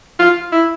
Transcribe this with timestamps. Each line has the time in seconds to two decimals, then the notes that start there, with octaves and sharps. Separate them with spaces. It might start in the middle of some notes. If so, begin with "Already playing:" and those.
0.20 F4
0.52 E4